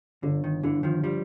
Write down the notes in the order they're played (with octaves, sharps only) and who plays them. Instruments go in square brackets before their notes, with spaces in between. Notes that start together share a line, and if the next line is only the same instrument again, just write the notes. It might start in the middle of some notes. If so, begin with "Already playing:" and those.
[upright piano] G1 [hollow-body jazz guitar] D3
[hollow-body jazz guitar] D#3
[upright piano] G1 [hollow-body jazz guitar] D3 E3
[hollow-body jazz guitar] D#3 F3
F3 G3